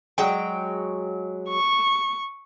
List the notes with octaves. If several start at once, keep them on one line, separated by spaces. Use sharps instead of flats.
F#3 G#3 G5
C#6